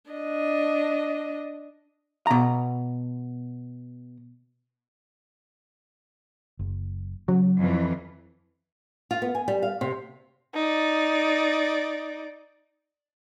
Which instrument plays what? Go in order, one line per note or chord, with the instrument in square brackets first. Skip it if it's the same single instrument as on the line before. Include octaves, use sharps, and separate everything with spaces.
[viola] D4 D#5
[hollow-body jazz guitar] B2 A#5
[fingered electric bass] F#1
[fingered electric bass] C#3 [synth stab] F#3
[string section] F2 E3
[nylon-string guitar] F4
B3
G#5
G3
F5
C3
[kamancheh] D#4 D5